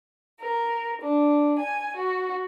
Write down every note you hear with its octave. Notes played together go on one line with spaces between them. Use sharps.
A#4
D4
G#5
F#4